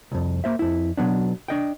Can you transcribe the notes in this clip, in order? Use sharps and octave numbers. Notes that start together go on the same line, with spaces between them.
C2 F2
A#3 C5 E5
F2 E4
B2 F#3 B3 D4
D4 D#5 G5